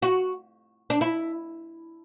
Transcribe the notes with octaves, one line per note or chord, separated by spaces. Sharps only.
F#4
D4
E4